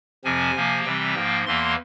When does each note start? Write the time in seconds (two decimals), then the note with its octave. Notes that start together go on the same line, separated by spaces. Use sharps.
0.24 F2 C3 F3 C4 G#5
0.54 C3 F3 A#3
0.84 C3 E3 G3 C4 G5
1.15 G#2 F3 A#3
1.46 E2 E3 A#3 C6